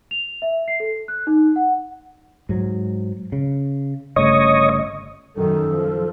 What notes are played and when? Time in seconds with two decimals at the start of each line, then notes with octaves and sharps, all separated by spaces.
0.11 F7
0.42 E5
0.68 C7
0.80 A4
1.08 F#6
1.27 D#4
1.56 F#5
2.49 G#2 F#3
3.32 C#3
4.16 G1 C#3 A3 C#5 D#5
5.36 F#2 D#3 A4
5.72 F3